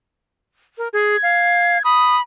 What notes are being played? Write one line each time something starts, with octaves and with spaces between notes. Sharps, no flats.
A#4
G#4 G#6
F5
B5 D#6